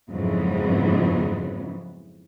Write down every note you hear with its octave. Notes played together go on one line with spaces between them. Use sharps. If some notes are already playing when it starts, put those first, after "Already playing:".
F2 G#2 C#3 E3 F#3 B3